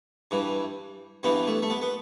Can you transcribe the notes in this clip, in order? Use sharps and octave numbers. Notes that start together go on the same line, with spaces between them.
G2 E3
G2 E3 B3
A3
A3
B3
B3